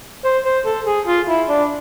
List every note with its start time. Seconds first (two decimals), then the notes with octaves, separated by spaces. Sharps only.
0.24 C5
0.45 C5
0.66 A4
0.86 G#4
1.07 F4
1.28 E4
1.49 D4